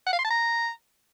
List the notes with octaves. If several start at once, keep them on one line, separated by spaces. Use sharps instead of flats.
F#5
F5
C6
A5
A#5